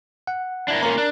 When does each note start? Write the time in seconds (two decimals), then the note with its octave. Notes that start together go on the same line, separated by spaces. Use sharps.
0.27 F#5
0.68 D4 E4 A#4
0.83 A#3 C#4 F4 A#4 A#5
0.98 D4